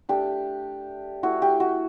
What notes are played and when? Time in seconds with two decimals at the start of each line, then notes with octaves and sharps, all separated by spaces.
0.09 A3 D4 G4
1.23 A3 E4 F#4
1.42 G4
1.60 F#4